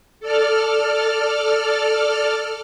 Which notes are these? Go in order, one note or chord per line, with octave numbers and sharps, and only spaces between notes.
A4 D5 F6